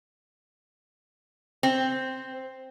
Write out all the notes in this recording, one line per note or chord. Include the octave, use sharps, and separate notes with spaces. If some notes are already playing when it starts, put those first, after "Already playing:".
C4